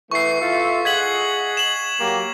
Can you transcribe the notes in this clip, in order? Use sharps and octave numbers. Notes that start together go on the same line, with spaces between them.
E3 A3 B3 C#6 C7
F4 A4 E5
G#4 D#5 F#5 G#6 B6 F#7
E7 F#7
F#3 A#3 G4